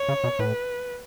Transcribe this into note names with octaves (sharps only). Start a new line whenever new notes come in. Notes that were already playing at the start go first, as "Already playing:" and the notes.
Already playing: C#5
C#3
B2
A2 B4